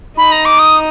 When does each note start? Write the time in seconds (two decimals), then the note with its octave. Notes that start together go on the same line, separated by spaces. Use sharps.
0.17 D#4 B5
0.32 A#5
0.45 D6
0.59 D#6